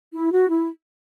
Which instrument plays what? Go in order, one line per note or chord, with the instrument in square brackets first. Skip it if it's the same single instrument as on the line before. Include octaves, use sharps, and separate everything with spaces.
[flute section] E4
F#4
E4